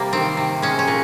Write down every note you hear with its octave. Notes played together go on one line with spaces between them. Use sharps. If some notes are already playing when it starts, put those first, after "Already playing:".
Already playing: C3 G3 A#3 G4
D#3 C4
C3
G#3 C#4
C#4
A#2